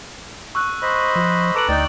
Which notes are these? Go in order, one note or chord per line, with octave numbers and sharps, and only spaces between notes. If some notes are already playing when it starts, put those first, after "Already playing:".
C#6 E6 F#6
C5 D#5 B5
F3
A4 B4 A#5 D6 D7 F#7
D2 D#4 D5 G5 A6